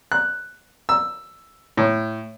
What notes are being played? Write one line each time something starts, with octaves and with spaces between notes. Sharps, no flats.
F#6
E6
A2